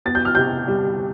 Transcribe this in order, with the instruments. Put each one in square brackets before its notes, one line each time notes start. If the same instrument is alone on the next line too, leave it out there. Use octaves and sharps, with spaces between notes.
[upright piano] B3 A6
G6
F6
C3 G6
G3